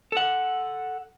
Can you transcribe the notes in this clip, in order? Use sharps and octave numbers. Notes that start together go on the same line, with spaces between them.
A4 F#5